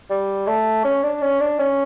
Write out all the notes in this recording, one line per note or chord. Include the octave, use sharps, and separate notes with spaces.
G3
A3
C#4
D4
C#4
D4
C#4